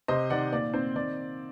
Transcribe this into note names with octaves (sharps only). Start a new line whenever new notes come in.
C3 C5 D#5
D#3 D5 F#5
A#2 D5
C4 C5
D#3 D5